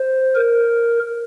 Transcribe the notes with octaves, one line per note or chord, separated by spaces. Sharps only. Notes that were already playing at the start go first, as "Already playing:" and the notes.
Already playing: C5
A#4